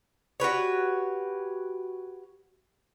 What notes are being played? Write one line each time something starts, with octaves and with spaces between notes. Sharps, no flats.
F#4 G4 B4 C#5